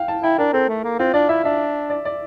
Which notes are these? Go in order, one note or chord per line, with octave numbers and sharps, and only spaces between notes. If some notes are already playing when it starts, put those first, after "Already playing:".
Already playing: F5 G5
A5
E4 G5
D4 A#4
C4 A4
A3
A#3
C4 F4
D4 D5
E4 E5
D4 E5
D5
D5